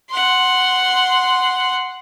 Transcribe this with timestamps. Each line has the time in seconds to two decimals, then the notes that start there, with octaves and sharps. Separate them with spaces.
0.11 F#5 C6